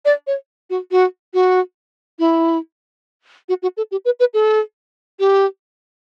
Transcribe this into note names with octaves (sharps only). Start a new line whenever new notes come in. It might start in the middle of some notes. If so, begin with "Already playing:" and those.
D5
C#5
F#4
F#4
F#4
E4
F#4
F#4
A4
G4
B4
B4
A4
G4